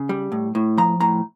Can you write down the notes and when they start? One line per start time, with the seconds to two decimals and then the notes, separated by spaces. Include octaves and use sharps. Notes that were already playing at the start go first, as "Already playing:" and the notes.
Already playing: C#3
0.09 G3
0.32 A2
0.55 A2
0.78 F3 A#5
1.01 A2 A#5